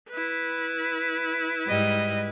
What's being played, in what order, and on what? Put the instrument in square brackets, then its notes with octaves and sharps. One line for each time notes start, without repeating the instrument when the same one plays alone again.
[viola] E4 B4
[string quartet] G#2 G3 D#5